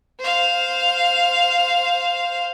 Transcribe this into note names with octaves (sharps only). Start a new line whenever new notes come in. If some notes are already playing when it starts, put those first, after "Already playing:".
C5 F5